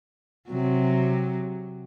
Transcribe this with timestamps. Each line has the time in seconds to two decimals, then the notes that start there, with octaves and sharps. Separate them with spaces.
0.49 C3 F#3